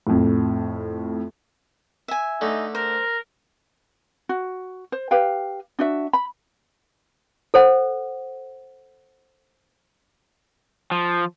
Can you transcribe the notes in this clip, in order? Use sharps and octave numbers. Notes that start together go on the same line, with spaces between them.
F2 A2
E5 G#5
D3 A3 D#4
A#4 C5
F#4
C5
G4 B4 F5 G5
D4 F#4 E5
B5
A4 C5 F#5
F3